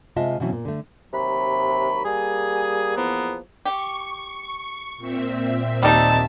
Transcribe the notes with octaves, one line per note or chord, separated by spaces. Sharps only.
C3 G#3 F4 D#5 E5 A5
B2 E3 F#3 C4 C#4 E4
A#2
D3 A3
D#2 C3 F#3 B5
G3 A#3 G#4
E2 F3 A#3 B3
G4 C#6
A#2 C4 E5
D#2 G3 D#4 A5